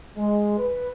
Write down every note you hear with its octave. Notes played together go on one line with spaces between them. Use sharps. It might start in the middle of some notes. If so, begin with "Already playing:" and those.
G#3
B4